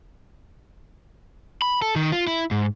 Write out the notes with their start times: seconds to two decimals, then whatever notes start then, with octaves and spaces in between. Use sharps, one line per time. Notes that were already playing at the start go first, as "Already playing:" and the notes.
1.62 B5
1.82 A4
1.96 D#3
2.12 F4
2.27 E4
2.51 G#2